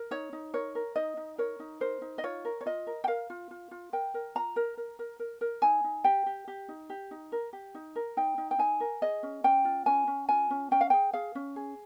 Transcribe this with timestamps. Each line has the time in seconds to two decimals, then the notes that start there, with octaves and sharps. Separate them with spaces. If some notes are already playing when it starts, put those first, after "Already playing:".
Already playing: A#4
0.11 D#4 C#5
0.33 D#4
0.54 A#4 C#5
0.75 A#4
0.96 D#4 D#5
1.17 D#4
1.38 A#4 C#5
1.60 D#4
1.80 A#4 C5
2.02 D#4
2.18 D#5
2.24 F4 C#5
2.45 A#4
2.61 C#5
2.66 F4 D#5
2.87 A#4
3.04 G5
3.08 A#4 F5
3.30 F4
3.51 F4
3.71 F4
3.93 A#4 G5
4.14 A#4
4.35 F4 A#5
4.56 A#4
4.77 A#4
4.99 A#4
5.19 A#4
5.41 A#4
5.62 D#4 G#5
5.84 D#4
6.04 G4 G5
6.26 G4
6.48 G4
6.69 D#4
6.90 G4
7.11 D#4
7.32 A#4
7.53 G4
7.75 D#4
7.96 A#4
8.17 D#4 G5
8.38 D#4
8.51 G5
8.58 D#4 G#5
8.80 A#4
9.02 G#4 D#5
9.23 C#4
9.44 C#4 G5
9.65 F4
9.86 C#4 G#5
10.07 C#4
10.29 F4 G#5
10.50 C#4
10.71 C#4 G5
10.81 F5
10.90 G#4 G5
11.13 G#4 F5
11.35 C#4
11.56 G#4